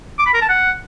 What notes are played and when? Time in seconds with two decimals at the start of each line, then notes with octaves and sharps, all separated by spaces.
0.19 D6
0.26 B5
0.34 A#4
0.41 A5
0.49 F#5